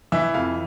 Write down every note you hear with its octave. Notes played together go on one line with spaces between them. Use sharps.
E3 E5
F2 F5